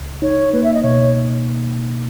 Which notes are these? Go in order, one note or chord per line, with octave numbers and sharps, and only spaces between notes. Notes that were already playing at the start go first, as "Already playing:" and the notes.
Already playing: C#2
D#4 C#5
A#3 B4
E5
D#5
B2 C#5